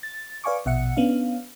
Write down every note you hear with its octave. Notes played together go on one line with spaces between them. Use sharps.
A6
B4 D5 F5 G#5 C#6 D6
A#1 B2 E5 F#5 C#7
B3 C#4 D4 F5